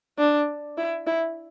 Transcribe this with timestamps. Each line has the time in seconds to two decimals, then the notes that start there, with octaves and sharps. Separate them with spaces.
0.19 D4
0.77 E4
1.07 E4